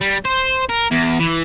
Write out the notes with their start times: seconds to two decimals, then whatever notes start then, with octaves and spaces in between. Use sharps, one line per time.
0.01 G3
0.25 C5
0.69 A#4
0.91 E2
1.20 E3